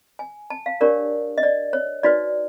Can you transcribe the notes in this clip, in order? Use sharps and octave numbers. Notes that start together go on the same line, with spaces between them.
G#5
A5
F5
D4 G4 A#4 C#5 D5
D#5
D5
C#5
D#4 F#4 B4 D5